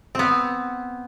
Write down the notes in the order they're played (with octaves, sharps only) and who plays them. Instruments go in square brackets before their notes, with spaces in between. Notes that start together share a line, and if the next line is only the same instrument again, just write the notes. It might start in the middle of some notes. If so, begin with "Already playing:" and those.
[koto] B3 C4